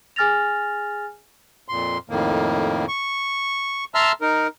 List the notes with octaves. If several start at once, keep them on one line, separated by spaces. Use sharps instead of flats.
G#4 G#5 F6 A6 A#6 F7
F2 A#2 C6
F2 A2 D#3 A#3
C#6
E5 A5 A#5 C6 E6 F6
D#4 A#4